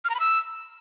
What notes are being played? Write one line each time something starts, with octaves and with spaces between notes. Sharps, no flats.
F6
A#5
B5
E6